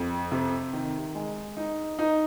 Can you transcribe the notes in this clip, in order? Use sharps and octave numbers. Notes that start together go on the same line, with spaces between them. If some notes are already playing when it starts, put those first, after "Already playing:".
Already playing: F2
C3
D#3
G#3
D#4
D#4